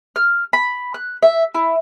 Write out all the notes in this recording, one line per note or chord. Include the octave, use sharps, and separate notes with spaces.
F6
B5
F#6
E5
E4